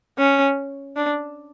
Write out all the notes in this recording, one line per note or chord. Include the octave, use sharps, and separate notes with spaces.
C#4
D4